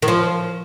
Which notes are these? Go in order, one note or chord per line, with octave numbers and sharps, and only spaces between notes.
D#3
F3